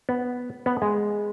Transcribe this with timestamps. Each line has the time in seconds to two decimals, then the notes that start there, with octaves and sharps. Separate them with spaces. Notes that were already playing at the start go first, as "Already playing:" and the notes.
0.09 B3
0.66 B3
0.82 G#3